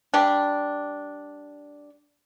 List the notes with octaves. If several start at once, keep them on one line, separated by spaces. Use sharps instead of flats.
G3 D4